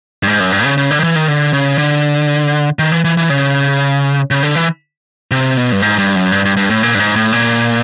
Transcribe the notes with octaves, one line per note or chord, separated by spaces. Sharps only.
G2
G#2
F#2
G2
C#3
C#3
D3
D#3
E3
D#3
D3
C#3
D3
D#3
E3
E3
E3
C#3
C#3
D3
E3
C3
B2
G2
G#2
G2
F#2
G2
G2
G2
A2
A#2
G2
G#2
A2
A#2